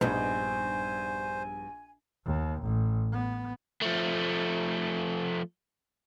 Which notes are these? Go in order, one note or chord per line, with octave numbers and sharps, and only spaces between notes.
A#1 G2 B3 D#4 C5 G#5
D#2
A1
B3
F3 A3